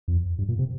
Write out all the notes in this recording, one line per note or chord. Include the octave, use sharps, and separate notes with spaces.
F2
G2
A#2
C3